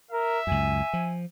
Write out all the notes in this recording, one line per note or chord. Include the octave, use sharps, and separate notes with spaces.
A#4 E5
C#2 F#2 G#5
F3